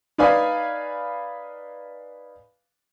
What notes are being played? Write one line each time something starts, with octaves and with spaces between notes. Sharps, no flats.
D#4 B4 D5 F5 G#5 B5